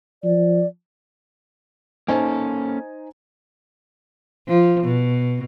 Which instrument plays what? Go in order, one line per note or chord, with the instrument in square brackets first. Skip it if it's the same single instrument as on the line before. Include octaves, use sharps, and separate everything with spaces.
[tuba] F3 [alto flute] D5
[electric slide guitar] A#3 C#4 A4 [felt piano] D#4 C5 G#5
[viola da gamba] F3
B2